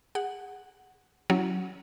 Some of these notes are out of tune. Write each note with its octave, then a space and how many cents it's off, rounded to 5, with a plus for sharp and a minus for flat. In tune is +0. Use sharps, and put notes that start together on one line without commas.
G#4 -30 F#5 +0
F#3 +0 C#4 +0 E4 +0